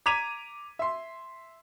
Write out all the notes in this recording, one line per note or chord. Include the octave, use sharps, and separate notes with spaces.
A#5 D6 G#6 B6 D#7 F7
E5 C6